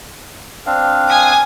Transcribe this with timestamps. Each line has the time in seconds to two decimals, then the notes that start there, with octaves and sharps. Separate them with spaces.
0.66 C4 D4 F5
1.08 G#5 D#6